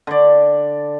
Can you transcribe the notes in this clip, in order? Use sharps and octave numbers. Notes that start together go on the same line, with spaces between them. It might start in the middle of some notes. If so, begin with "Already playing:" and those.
D3 D5